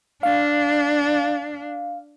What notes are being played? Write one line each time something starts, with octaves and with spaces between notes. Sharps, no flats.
D4 F5